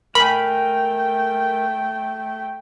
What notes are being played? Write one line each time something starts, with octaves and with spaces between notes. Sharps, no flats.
A3 A#4 G5 G#5 B5